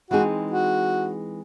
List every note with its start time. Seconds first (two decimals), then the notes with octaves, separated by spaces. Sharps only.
0.11 E3 G#3 C4 D#4 F#4 G#4
0.51 F#4